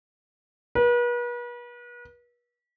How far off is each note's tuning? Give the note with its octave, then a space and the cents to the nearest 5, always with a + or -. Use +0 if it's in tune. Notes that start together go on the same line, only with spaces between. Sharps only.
B4 -40